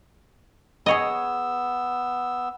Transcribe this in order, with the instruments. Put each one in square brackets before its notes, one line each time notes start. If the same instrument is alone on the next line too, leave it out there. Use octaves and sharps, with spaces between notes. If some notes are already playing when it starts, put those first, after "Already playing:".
[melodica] B3 E6 [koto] G#4 C#5 D#5